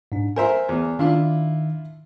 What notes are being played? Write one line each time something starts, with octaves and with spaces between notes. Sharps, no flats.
G#2 D4
A#4 C5 E5 G#5
E2
D#3 D4 E4 F4 E5